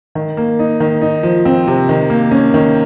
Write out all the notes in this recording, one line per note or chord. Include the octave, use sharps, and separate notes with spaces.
D#3
A#3
D#4
D#3
D#4
F3
C4
C3
D#3
A#3
C#4
D#3